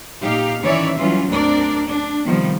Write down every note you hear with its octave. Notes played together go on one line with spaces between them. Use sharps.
A#2 D#4 G4 F5
D#3 E3 C#4 C#5 D5 E5
E3 F#3 G3 C#4 F4
D2 C4 D4 A#4 D5
D4
C3 D#3 F3 G3 B3